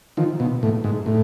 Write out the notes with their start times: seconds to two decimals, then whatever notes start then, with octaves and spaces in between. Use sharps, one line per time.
0.17 D#3 F3
0.40 B2
0.63 A2
0.84 G#2
1.06 A2